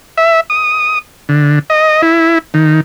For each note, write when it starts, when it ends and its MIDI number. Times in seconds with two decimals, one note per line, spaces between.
0.18 0.40 76
0.50 0.99 87
1.29 1.59 50
1.70 2.02 75
2.02 2.38 64
2.54 2.80 51